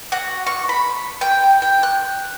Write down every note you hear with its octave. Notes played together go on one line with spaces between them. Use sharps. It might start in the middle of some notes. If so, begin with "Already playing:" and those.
F#4
C#6
B5
G5
G5
F#6